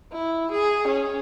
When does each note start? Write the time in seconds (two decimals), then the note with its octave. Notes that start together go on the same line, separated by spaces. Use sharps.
0.13 E4
0.51 G#4
0.88 C#4